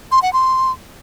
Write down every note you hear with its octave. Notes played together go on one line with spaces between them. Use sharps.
C6
F#5
C6